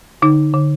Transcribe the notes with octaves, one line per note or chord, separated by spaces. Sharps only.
D3 D#4
D3